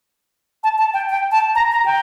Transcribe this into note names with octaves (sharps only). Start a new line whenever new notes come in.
A5
A5
G5
G5
A5
A#5
A#5
G5